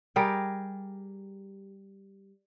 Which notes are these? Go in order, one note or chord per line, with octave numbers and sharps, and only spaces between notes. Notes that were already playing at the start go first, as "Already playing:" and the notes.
G3 G4 G#4 A#4